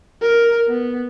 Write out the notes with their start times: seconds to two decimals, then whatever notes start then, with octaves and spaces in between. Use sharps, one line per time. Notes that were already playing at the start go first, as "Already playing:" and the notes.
0.22 A#4
0.68 B3